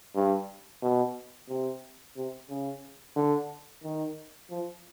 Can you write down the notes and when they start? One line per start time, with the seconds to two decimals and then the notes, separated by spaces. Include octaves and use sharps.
0.15 G2
0.82 B2
1.49 C3
2.16 C3
2.50 C#3
3.16 D3
3.84 D#3
4.50 F3